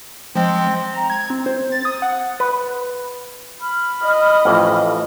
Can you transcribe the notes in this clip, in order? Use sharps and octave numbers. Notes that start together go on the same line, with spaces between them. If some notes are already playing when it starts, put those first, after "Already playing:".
F3 G#3 C4
A#5
G#6
C4
C5
A6
D#6
F#5
B4
B5 F6
D#5
A1 F2